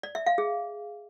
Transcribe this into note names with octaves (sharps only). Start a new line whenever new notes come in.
D5
E5
F5
G#4